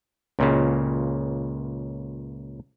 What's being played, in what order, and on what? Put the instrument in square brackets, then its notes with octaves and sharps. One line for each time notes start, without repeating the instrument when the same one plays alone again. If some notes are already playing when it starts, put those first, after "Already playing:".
[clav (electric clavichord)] C#2 A#2 C#3